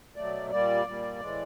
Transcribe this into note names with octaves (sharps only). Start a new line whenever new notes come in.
B2 F#3 A3 D5
A#2 G3 A#3 D5
A#2 G3 A#3
A2 E3 G#3